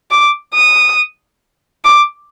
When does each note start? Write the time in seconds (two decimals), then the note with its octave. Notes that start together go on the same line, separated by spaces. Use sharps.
0.11 D6
0.54 D#6
1.84 D6